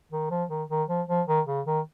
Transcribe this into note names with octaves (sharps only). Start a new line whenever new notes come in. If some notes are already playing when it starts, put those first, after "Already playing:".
D#3
F3
D#3
D#3
F3
F3
D#3
C#3
D#3